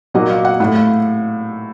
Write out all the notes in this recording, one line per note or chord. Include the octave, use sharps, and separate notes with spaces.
A#2 F#3 A#3 D#5
F5
F#5
A2 A3 F#5
F5